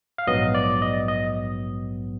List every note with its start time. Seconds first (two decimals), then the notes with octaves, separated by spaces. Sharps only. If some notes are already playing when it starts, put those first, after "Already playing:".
0.18 F5
0.27 A#1 G#2 F#3 B3 D#5
0.55 D5
0.82 D#5
1.08 D#5